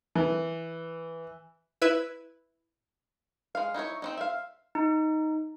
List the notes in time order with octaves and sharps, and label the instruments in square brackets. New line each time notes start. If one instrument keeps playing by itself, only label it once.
[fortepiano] E3
[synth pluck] E4 B4 E6 G#6
[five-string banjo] G#3 F5
D#4 E4 F#4 C#5
C4 C#4 D#4
E5 F5
[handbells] D#4